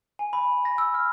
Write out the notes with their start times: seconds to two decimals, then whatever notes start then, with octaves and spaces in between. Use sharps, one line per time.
0.19 G#5
0.33 B5
0.65 A#6
0.78 E6
0.94 F6